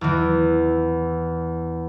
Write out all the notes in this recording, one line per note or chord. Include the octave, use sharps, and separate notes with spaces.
E2 E3